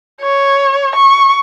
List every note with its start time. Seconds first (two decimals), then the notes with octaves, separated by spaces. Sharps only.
0.22 C#5
0.96 C#6